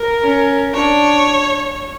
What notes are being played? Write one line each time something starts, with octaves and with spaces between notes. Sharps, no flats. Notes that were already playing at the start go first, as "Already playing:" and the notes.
Already playing: A#4
C#4
D4 C#5